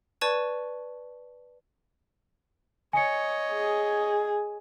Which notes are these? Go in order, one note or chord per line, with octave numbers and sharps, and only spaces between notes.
B4 D5 A5 C#6 G#6 D#7
C#5 D#5 G#5 C#7
G#4